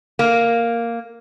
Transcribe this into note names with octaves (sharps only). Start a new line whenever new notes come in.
A#3